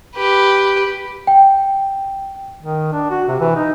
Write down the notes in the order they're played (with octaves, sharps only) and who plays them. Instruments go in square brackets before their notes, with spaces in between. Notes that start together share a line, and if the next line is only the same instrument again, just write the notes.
[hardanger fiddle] G4 B4
[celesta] G5
[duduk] D#3
D4
F#4
C3
E3
D#4